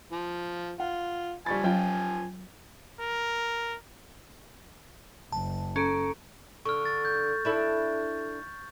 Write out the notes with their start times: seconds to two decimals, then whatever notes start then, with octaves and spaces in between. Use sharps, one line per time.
0.12 F3
0.80 F4 F#5
1.46 F3 G3 G#5 B5 C#6 A6
1.64 F#3 C#4 F4 G5
3.01 A#4
5.32 F#1 A5
5.76 C#4 A4 A#5 C#6 D7
6.65 D3 C#6 F6
6.85 A6
7.05 G6
7.45 D4 E4 A4